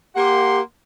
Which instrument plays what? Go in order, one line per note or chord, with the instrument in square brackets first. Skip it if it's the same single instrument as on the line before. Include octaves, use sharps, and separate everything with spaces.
[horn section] A#3 F#5 C6 [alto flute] G4